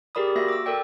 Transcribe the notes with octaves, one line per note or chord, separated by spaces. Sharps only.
G4 G#4 A#4 D5 B5 D#6
A#3 F#4 E5 A#6
D6 E6
A4 A#4 D5 G5